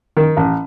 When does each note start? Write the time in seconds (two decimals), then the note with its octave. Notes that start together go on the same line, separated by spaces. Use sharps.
0.17 D#3
0.37 A1